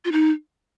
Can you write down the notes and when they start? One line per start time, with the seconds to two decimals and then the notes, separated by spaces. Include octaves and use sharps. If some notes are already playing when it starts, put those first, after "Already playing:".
0.05 F4
0.12 D#4